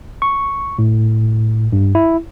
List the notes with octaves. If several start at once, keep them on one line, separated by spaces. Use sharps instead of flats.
C#6
A2
G2
E4